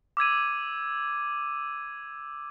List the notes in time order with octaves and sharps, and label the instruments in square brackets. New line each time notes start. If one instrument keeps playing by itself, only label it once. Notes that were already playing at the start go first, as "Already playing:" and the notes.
[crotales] D6 E6 G#6 D#7